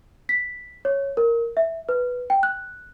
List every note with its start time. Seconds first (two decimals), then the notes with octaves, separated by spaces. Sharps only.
0.29 B6
0.85 C#5
1.17 A#4
1.57 E5
1.89 B4
2.30 G5
2.43 F#6